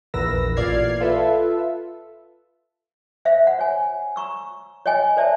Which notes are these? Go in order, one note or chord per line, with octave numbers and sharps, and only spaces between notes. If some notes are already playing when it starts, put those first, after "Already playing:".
A#1 E2 A#4 B4 E6 A#6
A1 A#2 D5 F6 G#6 C7
F4 A4 B4 E5
C5 E5 F5
F#5
C#5 G#5
A#5 C#6 E6
C#5 D#5 G5 G#5
A#4 C5 D5 E5 A5